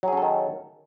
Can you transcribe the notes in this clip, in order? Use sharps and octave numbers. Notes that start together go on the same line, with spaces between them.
D#3 F#3 C#4 G#4 A4